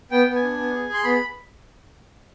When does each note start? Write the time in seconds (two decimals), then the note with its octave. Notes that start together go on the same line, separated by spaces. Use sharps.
0.11 B3 G5
0.27 B3
0.36 G#5
0.43 D4
0.58 B3
0.74 G#4
0.89 G#4 C6
1.04 B3 B5